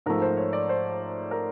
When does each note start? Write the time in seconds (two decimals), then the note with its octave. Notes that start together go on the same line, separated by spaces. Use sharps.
0.06 G#2 F3 A3 A#4
0.22 C5
0.37 C#5
0.53 D5
0.69 C5
1.31 A#4